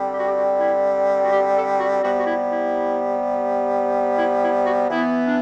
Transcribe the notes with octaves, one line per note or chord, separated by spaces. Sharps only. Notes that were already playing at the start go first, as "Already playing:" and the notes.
Already playing: D3 G3 C4
G4
F#4
G4
F#4
E4
F#4
G4
A4
F#4
C3 G3 B3 F#4
F#4
E4
E4
E4
E4
F#4
E3 B3 E4
D4